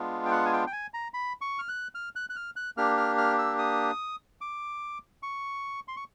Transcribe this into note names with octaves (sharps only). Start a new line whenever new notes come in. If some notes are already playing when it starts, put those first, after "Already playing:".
Already playing: G#3 B3 D4 F4
G5
F#5
G#5
G5
G5
G#5
A#5
B5
C#6
F6
F#6
F6
F#6
F#6
F6
F#6
A#3 D4 G4 F6
F6
F6
E6
D#6
D6
C#6
C6
C#6